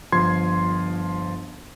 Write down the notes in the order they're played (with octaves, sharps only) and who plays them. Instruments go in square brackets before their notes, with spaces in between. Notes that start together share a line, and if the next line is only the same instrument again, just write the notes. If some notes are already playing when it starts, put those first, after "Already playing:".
[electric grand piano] G1 F3 C6 G#6